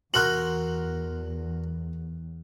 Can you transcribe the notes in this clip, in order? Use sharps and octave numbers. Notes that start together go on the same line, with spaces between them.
E2 F#4 A#4 C6 F#6 F#7